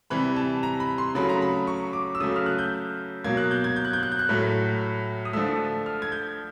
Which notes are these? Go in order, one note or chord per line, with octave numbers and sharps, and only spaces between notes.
C3 E3 G3 B5
A5
A#5
B5
C6
C#3 F#3 A3 B5
A#5
B5
C#6
D6
E6
C#3 F#3 A3 D#6
F6
F#6
G6
B2 F#3 A#3 G#6
F#6
G6
G#6
G6
F#6
G6
F#6
G6
F#6
A2 F#3 A3
D#6
D3 F3 A3 E6
F6
G#6
G6